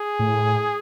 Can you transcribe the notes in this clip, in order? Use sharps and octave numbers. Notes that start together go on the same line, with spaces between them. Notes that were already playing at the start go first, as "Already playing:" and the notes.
Already playing: G#4
A2